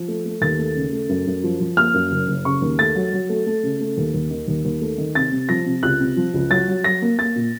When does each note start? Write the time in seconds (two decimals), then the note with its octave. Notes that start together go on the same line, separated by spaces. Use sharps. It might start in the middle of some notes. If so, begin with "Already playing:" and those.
Already playing: F3
0.08 A3
0.25 A3
0.41 D#2 A6
0.59 A3
0.76 C#3
0.92 A3
1.09 F#2
1.27 F#2
1.44 F3
1.60 F3
1.77 A#3 F6
1.94 F#2
2.11 F#1
2.28 F#1
2.45 C#3 C#6
2.62 D#2
2.79 A3 A6
2.95 F#3
3.12 F#3
3.29 A3
3.46 A3
3.63 C#3
3.80 A3
3.97 D#2
4.14 D#2
4.31 D#3
4.48 D#2
4.65 D#2
4.81 A3
4.98 D#3
5.15 C3 A6
5.32 C3
5.49 F3 A#6
5.66 C3
5.83 C#2 F#6
6.00 C3
6.17 F3
6.34 C#2
6.50 F#3 A6
6.68 F#3
6.84 F#3 A#6
7.02 A#3
7.18 A#3 A6
7.36 A#2